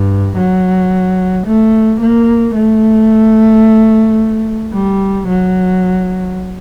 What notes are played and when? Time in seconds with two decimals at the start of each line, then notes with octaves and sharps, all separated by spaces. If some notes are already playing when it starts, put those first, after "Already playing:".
Already playing: G2
0.37 F#3
1.47 A3
2.01 A#3
2.55 A3
4.73 G3
5.28 F#3